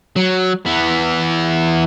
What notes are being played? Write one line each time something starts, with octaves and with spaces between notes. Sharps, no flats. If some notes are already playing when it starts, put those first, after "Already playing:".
F#3
E3 B3